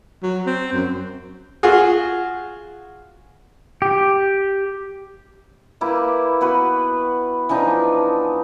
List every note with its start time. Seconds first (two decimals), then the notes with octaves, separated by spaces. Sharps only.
0.23 F#3
0.46 C4
0.73 F#2
1.63 F4 F#4 G#4
3.82 G4
5.81 A#3 E4 G4 B4
6.41 B3 F#4 B4
7.49 E3 F3 D4 D#4